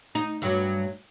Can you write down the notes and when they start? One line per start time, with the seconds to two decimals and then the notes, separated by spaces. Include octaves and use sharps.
0.15 D#4
0.42 G2 F#3